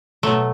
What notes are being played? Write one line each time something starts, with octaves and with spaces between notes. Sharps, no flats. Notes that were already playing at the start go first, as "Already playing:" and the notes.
B2 F#3 A3